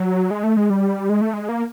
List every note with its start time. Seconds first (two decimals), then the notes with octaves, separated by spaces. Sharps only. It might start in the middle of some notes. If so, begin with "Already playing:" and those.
Already playing: F#3
0.31 G#3
0.43 A3
0.57 G#3
0.70 G3
1.09 G#3
1.21 A3
1.33 G#3
1.49 A#3